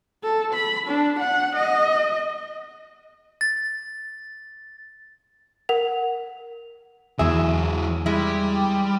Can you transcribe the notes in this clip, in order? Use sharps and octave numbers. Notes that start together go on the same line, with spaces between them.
A4
B5
D4
F#5
D#5
A6
A#4 F#5 F7
E2 E3 F#3 G#4 E5
G3 G#3 E4